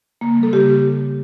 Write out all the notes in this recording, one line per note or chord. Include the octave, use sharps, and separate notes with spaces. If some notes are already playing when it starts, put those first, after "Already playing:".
C#3 A#3
G3 A#3
A4
C#3 G4